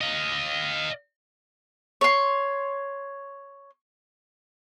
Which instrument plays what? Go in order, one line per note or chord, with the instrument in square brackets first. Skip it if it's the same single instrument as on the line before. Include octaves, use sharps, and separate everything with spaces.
[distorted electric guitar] D#5 F5
[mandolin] C#5 C6